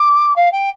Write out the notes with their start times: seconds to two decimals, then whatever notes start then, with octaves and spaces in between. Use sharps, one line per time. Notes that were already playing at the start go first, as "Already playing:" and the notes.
Already playing: D6
0.36 F5
0.52 G5